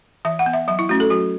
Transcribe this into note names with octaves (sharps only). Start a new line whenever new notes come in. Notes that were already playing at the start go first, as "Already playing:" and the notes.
E3 E5
F#5
B3
E5
F#3 E5
E4
A3 C#4 F#4
A4
F#3 F#4